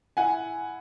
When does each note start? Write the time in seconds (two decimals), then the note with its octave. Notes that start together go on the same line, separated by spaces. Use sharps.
0.17 E4 F#5 G#5